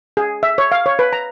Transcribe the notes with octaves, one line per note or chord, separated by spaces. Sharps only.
G#4
E5
C#5
F5
C#5
B4
A#5